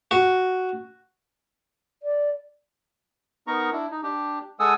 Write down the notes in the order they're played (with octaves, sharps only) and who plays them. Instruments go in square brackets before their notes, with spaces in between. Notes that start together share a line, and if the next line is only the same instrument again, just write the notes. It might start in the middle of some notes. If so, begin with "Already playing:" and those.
[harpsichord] F#4
[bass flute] D5
[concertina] B3 D#4 A#4 A#5 C#6
D4 E4
D#4
D4 G4
G#3 A4 F#5 G#5 D#6 E6